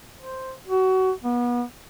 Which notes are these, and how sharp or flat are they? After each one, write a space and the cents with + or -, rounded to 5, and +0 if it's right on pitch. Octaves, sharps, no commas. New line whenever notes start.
C5 +0
F#4 +25
B3 -30